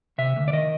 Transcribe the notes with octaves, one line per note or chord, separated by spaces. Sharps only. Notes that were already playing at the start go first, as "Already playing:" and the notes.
C3 E5
D2
D5
D#3 D#5